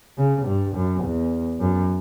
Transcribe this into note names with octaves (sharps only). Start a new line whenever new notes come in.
C#3
G2
F#2
E2
F#2